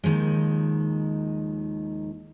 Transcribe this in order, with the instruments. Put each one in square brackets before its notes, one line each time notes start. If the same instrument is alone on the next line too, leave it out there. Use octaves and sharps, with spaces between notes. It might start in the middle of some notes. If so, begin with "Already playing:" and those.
[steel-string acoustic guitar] D#2 D#3 F3 G#3